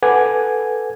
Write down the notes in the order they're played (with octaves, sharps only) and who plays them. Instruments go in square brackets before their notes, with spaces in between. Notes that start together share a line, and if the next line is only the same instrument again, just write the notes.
[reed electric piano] A4 B4 F#5 G#5 D6 G#6